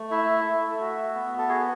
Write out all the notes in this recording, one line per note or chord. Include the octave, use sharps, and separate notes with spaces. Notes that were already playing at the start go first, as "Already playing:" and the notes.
Already playing: A3
E4 E5
A3
F#4
B3
A4
F#4 G#4